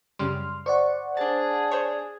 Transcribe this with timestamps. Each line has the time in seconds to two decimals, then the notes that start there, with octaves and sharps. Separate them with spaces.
0.19 F#2 C#3 G3 C6 F6
0.66 C5 D5 F#5 C#6
1.17 D4 G#4 A5
1.71 C5 C#5